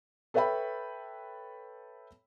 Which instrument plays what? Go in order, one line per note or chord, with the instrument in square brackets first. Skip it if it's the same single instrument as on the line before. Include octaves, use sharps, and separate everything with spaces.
[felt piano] A4 B4 C#5 E5 G5 B5